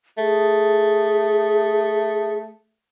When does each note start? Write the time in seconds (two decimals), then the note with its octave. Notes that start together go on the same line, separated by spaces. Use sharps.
0.18 A3 G#4